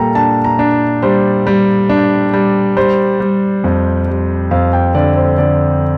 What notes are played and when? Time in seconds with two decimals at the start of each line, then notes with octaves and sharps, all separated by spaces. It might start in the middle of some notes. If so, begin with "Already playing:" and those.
Already playing: A#2 G3 A4 A#4 G5 A#5
0.15 D4 A5
0.44 A#5
0.59 D4
1.02 G3 C5
1.47 G3
1.89 D4
2.34 G3
2.77 G3 C5
3.20 G3
3.64 F2
4.08 G3
4.51 F2 F5
4.73 G5
4.95 D3 D5
5.16 C5
5.38 D3 D5